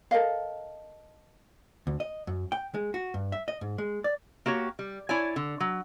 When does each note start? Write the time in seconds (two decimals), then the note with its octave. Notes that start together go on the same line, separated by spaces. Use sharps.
0.11 A4 A#4 D#5 F5
1.87 D2
2.00 D#5
2.27 F#2
2.52 G5
2.74 G#3
2.94 F#4
3.14 G2
3.32 E5
3.48 D#5
3.61 G#2
3.78 G#3
4.04 D5
4.46 A#3 F#4 G4 C#5
4.79 G3
5.09 E4 C#5 D5 G#5
5.36 D3
5.60 F#3